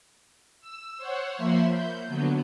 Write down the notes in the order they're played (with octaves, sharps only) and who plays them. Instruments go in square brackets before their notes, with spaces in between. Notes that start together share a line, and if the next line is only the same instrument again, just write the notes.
[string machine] E6
C5 C#5 F#5
F3 A#3 E5 B5 C6
G6
D3 F#3 B3